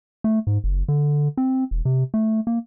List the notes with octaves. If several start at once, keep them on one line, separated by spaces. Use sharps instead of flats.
A3
G#2
F#1
D3
C4
E1
C3
A3
A#3